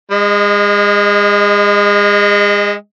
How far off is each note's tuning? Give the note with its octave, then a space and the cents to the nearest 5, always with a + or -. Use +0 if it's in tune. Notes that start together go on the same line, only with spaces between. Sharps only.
G#3 -30 D#5 +0